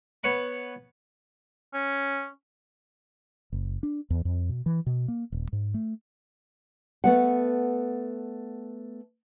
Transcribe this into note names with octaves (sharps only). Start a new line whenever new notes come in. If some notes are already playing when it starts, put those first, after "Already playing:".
B3 B4 C#5 F#5 B5
C#4
F#1
D4
E2
F2
B2
E3
B2
A#3
D#1
G#2
A3
A3 B3 F#5